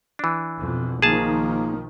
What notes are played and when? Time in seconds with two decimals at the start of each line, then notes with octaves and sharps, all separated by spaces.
0.19 E3 D4
0.60 F2 B2
1.02 B1 D#3 F3 A#3 G#4 A5